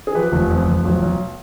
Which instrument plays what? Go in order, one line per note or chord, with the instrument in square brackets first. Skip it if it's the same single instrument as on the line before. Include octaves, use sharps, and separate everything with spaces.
[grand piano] G#4
F3 G4 B4
F1
F2
F1
B1
B1